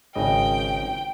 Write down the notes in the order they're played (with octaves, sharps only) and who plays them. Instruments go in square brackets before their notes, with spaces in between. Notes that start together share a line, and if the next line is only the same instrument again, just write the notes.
[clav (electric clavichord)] G#1 C#3 D#5 [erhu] G5